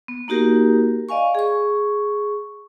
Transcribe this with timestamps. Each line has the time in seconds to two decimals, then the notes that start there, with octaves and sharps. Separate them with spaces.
0.08 B3
0.28 A#3 D#4 F#4 G4 A#4
1.09 D5 D#5 F5 G#5 C#6
1.35 G#4 C#6